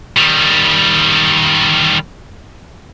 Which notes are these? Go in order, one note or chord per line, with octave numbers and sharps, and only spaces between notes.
D#3 G3